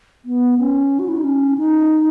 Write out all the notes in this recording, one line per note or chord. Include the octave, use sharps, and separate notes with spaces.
B3
C#4
F#4
E4
D#4
C#4
D#4